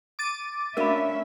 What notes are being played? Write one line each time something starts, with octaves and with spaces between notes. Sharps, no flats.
D6 A6 D#7
A3 A#3 C#4 D4 F#4 A#4 E5 B5